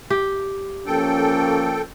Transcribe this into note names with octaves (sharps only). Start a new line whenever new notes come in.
G4
F3 A#3 C#4 A4 G5